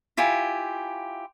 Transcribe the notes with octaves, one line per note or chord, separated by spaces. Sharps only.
E4 F4 G4 G#5